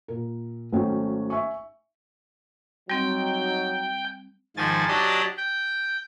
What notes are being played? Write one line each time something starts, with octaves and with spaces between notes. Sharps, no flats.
A#2 A#4
G#1 F#3 A3 C#4 G5
E5 G#5 C#6
F#3 G3 C4 D#4 G5
G#2 D#3 F3 G#5 A6
F#3 D4 G4 D5 D#5 A5
G5